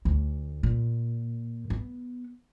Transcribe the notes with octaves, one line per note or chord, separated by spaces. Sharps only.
D2
A#2
B3